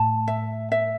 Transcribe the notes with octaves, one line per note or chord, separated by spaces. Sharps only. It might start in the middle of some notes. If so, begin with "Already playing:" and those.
Already playing: A2 A5
E5
E5